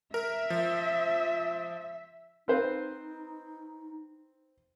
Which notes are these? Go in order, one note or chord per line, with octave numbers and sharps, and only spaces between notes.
A#4 E5
F3
C4 D#4 B4 C5